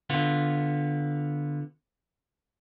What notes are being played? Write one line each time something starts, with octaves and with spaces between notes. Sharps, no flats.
D3 B3 F4